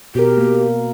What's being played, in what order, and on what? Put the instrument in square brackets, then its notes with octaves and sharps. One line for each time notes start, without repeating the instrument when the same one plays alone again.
[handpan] B2 A#4 [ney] G4
[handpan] A#3